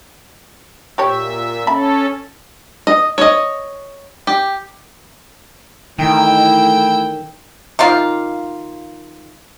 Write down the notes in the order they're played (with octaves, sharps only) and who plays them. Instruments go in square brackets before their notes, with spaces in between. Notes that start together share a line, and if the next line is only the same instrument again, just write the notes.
[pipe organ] A#2 E5 [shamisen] G4 C#5
[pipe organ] C#4 A4 [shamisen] E5 B5
[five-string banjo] D#5
C#5 D#5
G4
[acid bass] D#3 [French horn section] E3 A3 [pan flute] E4 [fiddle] G5 E6
[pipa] D#3 A#3 F4